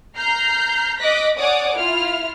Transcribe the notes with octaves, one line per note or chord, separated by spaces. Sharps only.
A#5 F6 G6 C7
D#5 D6 F#6 A#6 B6
C#5 D5 F#5 G#5 D6 D#6
E4 F4 F6